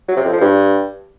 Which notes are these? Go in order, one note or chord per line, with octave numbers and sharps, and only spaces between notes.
F#3
C3
F2
F3
G2